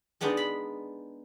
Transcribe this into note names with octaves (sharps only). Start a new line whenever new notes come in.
G#3 B3 D4 D#4
B5